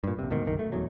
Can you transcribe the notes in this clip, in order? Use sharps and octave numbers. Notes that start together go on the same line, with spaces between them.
G2 A#2
A#1 C3
D2 G#2 B2 D#3
F#1 B1 D#3
A3
D#1 E2 F#3